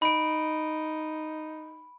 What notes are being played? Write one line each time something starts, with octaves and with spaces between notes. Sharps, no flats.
D#4 B5 D7